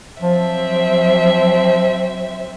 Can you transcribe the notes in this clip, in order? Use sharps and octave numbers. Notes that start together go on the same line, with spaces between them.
F3 F#3 C4 E5